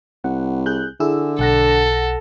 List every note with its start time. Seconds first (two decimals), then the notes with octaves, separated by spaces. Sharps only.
0.24 C2 F#5
0.66 G#4 F#6 G6
1.00 D3 E4 G#4 E6
1.39 B1 A4 F#5 A#6